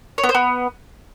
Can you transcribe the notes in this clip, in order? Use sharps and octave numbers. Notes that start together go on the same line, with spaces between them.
C#5
B3
C5
B3